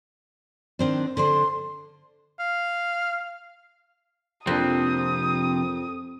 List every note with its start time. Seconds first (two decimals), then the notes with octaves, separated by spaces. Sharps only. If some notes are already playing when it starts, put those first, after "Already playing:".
0.79 D#3 C4 D4
1.17 D3 D4 C5 C6
2.40 F5
4.47 F2 C3 F3 A#3 C4 D4 D#6